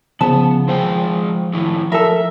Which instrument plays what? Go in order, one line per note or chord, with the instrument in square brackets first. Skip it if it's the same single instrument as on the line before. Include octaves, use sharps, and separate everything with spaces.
[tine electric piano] C#3 F3 [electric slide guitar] B3 [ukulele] A5
[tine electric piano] F3 [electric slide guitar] G#3 C5 G5
[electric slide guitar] A2 D#3 E4
[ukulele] A4 A#4 [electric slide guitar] E5